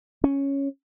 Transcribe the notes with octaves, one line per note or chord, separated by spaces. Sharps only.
C#4